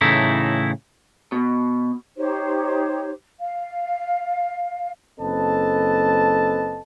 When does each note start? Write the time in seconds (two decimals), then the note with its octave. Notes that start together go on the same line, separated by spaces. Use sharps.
0.01 A2 C#3 E3 A3 D#4 E4
1.32 B2
2.17 D#4 G4 C5 C#5
3.39 F5
5.20 F#1 C4 A4 B4 D#5 A5